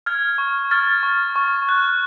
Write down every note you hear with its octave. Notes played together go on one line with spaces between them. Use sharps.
F6 G#6
C#6
F6 A6
C#6
C#6
F#6